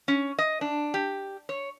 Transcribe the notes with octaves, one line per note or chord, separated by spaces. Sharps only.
C#4
D#5
D4
G4
C#5